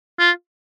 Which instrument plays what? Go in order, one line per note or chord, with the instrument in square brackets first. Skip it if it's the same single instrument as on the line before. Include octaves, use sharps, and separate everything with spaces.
[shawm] F4